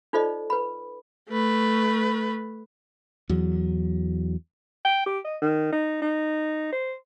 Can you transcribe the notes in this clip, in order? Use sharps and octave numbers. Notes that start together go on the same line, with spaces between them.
D#4 F4 A4 C5 D5 D#5
B4 B5
A3 B4
E2 F#3
G5
G4
D#5
D#3
D#4
D#4
C5